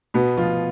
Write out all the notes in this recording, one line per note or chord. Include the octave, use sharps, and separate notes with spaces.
B2 B3
F3 F4